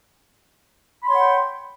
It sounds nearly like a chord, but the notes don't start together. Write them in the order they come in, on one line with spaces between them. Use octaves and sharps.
B5 C6 C#5 F#5 G5